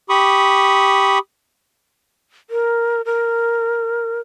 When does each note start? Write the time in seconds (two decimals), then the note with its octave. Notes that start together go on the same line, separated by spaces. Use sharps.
0.09 G4 B5 C#6 D#6
2.50 A#4
3.05 A#4